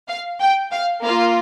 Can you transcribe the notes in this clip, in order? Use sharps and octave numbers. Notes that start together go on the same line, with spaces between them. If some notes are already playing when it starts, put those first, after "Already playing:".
F5
G5
F5
A#3 F4 F5